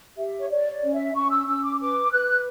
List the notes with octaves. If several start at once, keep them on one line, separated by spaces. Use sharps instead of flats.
G4 E5
C#5
C#5 D5
D5
C#4
E5
C#4 C#6
E6
C#4 E6
D6
B4 D6
B4 F#6